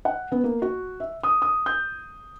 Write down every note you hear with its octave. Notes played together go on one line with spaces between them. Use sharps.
F#5
B3
A#3
F#4
E5
D#6
D#6
G6